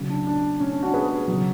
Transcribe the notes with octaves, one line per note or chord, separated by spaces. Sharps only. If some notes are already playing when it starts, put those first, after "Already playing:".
Already playing: C#3 F#3
D4
D4
C#4
D4
D4 F#4
G#4 B4
F#3
C#3